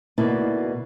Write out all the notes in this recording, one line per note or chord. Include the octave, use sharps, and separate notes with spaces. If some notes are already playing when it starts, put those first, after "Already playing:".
D2 B2 A#3 D#4 E4 D5